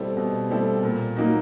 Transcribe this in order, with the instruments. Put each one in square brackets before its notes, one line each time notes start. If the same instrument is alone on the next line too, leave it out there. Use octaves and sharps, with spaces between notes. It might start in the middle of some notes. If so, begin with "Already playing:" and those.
Already playing: [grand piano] B2 G3 C4 E4 A4
B2
G3 C4 E4 A4
A#2
F#3 A#3 D#4 F#4